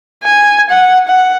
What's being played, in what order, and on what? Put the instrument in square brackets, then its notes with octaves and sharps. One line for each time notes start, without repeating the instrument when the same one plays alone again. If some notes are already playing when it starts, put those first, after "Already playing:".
[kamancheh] G#5
F#5
F#5